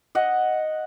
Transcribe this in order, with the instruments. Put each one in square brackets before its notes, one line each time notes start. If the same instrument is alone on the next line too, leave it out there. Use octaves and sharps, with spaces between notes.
[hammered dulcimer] D#5 F#5